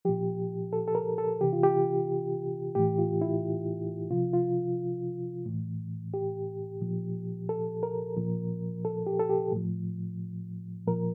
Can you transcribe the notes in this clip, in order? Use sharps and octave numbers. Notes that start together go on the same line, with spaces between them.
A#2 F3 G4
A4
A4
A#4
A4
C3 E3 G4
F4
G4
A2 E3 G4
F4
E4
C3 F3 F4
F4
A2 E3
G4
A#2 F3
A4
A#4
A#2 F3
A4
G4
A4
G4
A2 F3
A#2 F3 A#4